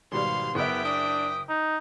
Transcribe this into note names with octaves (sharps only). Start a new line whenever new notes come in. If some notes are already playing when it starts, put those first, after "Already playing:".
G#1 B2 G3 F5 C6
F#1 B3 E5 G5 D6
D4 D#6
D#4